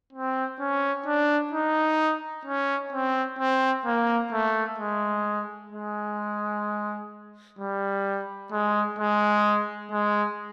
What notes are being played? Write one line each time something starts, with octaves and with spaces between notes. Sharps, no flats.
C4
C#4
D4
D#4
C#4
C4
C4
A#3
A3
G#3
G#3
G3
G#3
G#3
G#3